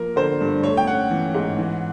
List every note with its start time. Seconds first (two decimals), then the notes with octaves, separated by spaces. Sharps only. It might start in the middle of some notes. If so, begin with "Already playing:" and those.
Already playing: F3 A#3 A#4
0.16 D3 C5
0.41 G2
0.63 A3 C#5
0.77 G5
0.87 C#4 F#5
1.11 E3
1.35 G#2
1.58 E3